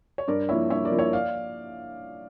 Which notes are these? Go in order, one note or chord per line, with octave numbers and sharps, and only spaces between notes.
C#5
G2 A#4 D5
F3 A#3 E4 C#5 E5
G2 C#5 E5
A#4 D5
F3 A#3 E4
C#5 E5
D5 F5